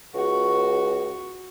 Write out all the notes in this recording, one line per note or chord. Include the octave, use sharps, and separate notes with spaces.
C#2 F#4